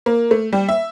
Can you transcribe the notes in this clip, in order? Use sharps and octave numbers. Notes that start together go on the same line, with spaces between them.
A#3
A3
G3
E5